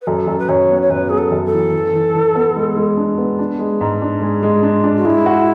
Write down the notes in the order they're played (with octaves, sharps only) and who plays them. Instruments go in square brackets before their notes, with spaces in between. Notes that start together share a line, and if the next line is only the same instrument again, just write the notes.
[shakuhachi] B4
[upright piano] F#2 [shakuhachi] A4
[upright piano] F#2
[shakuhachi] B4
[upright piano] F#2 [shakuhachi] C#5
[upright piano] B3
[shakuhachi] C#5
[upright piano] F#2 [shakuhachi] B4
[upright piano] B3 [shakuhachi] G#4
[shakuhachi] A4
[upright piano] F#2
[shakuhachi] A4
[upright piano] E3
E3
E3
E3
B3
G#3
G#3
D4
B3
D4
G#3
G#2
D4
G#3
G#3
D4
D4
[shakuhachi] F#4
[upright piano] G#3 [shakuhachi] E4
[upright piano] F#4